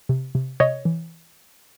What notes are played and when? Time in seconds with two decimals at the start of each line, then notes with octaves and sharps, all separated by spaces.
0.09 C3
0.35 C3
0.60 C3 C#5 D#5
0.85 E3